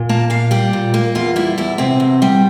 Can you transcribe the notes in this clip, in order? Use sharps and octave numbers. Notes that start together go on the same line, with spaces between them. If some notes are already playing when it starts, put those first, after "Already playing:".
Already playing: A#2
A#3 A5
A#2 F5
G3 G4
A#2
A#3
E2 F4
G3 E4
E2 E4
C3 C4
E2
G3